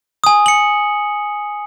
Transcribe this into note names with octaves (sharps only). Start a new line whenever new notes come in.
G#5 D#6
C#7 F#7